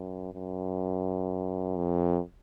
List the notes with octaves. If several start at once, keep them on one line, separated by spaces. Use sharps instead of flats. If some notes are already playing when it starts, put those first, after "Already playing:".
Already playing: F#2
F#2
F2